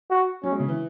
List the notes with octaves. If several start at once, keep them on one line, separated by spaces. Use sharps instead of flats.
F#4
F#3 C#4
G#3
C#3
E3